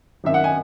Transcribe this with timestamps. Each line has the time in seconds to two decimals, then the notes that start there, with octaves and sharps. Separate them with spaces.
0.24 G#1 F#2 D#3 E5
0.34 F#5
0.44 G#5